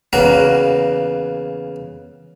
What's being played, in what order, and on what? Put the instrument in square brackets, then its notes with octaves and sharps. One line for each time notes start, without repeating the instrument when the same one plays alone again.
[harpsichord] E2 C#3 A#3 F#4 A#5